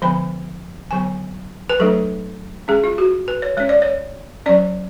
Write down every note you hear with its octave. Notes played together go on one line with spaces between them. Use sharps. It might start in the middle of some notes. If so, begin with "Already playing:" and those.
D3 F3 G#3 B3 B5
D3 F#3 B3 G#5
B4
F#3 A3 D4 A4
G#3 C#4 G#4
F4
F#4
B4
C#5
G#3 C#4 C#5
D5
C#5
F#3 C#4 D5